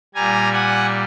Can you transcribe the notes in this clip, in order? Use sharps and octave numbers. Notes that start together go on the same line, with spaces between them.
A#2 G3 G#5 A#5
F#5 G#5